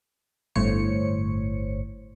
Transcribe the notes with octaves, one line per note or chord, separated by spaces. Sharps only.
G1 A2 C5 C#5 C#7